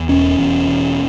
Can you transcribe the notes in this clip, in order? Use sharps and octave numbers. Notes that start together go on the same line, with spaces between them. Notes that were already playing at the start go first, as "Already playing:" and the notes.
Already playing: E2
E1 C#4
E2
E1